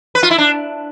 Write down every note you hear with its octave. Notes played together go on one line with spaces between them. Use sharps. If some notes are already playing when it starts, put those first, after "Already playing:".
B4
F4
E4
D4